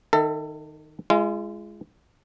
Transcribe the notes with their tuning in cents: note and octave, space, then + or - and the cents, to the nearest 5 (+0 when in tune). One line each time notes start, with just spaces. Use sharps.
D#3 -10 A4 +35 E5 -10
G#3 +0 F4 -40